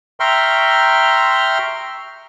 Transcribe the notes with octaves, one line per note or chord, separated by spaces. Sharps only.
E5 G5 A#5 C6 C#6 F6